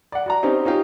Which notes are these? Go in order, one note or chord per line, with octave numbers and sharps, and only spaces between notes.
D5 F#5
F#4 D5 A#5
C4 C#4 D#4 G4
C#4 D#4 F4 G4